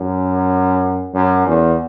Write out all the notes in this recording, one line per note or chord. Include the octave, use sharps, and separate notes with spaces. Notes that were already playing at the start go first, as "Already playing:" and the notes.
Already playing: F#2
F#2
E2